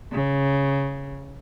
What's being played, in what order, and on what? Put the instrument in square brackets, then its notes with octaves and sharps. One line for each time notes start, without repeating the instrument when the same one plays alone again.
[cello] C#3